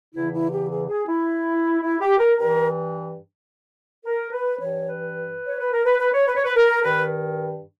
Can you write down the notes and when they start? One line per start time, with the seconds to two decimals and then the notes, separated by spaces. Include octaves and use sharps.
0.15 E2 C#3 E3 E4
0.33 E4
0.52 G4
0.71 G#4
0.88 G#4
1.08 E4
1.82 E4
2.00 G4
2.19 A#4
2.38 G2 E3 A#4
4.05 A#4
4.32 B4
4.60 G2 E3 C#5
4.88 B4
5.47 C#5
5.60 B4
5.72 A#4
5.85 B4
5.99 B4
6.13 C#5
6.27 B4
6.36 C#5
6.44 B4
6.55 A#4
6.83 G2 D#3 B4